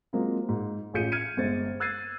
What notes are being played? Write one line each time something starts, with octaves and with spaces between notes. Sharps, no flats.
F#3 G#3 A#3 C4 F4
G#2
A1 F4 G#4 G6 C#7 D#7
F6 G#6 C#7 D#7
G1 G#3 C5 A6
E6 F#6 G#6 A6 C7 D#7